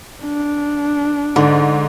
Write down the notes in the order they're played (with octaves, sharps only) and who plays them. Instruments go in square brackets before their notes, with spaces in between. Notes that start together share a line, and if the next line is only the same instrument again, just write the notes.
[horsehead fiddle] D4
[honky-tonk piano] G#2 [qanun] D3